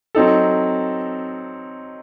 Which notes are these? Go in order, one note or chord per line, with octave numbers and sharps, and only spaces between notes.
F#3 C4 D#4 A4